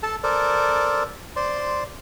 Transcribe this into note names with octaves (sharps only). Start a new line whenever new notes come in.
A4 A5
A4 A#4 C5 D5
C5 D5 C6